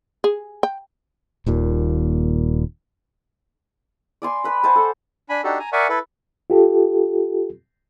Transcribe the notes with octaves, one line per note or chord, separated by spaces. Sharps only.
G#4
G5
D#1 D#2 A#2
D5 G#5 C6
B4 B5
C5 F#5 G#5 A5
A4
D4 G#5 B5
D4 D#4 F#4 G4 A4
G#5 A#5
A#4 D5 E5 F#5 G#5 C#6
E4 A4 B4
F4 G4 A4